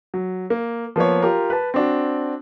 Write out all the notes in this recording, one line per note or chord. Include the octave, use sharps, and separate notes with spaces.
F#3
A#3
F3 A#3 B3 C#5
F4 G4 A#4
B4 A5
C4 D4 F#4